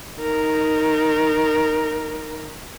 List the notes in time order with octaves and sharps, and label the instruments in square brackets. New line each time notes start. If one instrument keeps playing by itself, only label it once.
[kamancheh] D#4 A#4